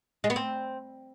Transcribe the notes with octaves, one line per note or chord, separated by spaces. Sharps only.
G#3
B3
C4